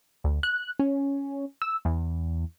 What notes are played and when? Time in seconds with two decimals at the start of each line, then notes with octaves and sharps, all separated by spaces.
0.24 D2
0.43 F#6
0.79 C#4
1.62 E6
1.85 E2